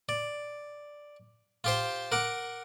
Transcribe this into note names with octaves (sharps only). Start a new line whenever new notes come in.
D5
F4 G4 C5
A#4 F#5 D6